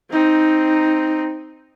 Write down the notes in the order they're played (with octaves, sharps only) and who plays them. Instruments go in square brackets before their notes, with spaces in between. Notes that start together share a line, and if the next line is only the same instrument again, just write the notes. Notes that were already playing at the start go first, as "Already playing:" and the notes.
[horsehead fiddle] C4 D#4